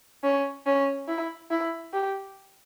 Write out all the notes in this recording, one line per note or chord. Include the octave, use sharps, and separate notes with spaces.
C#4
C#4
E4
E4
G4